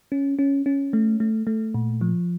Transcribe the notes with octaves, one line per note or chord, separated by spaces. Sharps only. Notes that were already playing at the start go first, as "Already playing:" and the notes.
C#4
C#4
C#4
A3
A3
A3
A#2
F3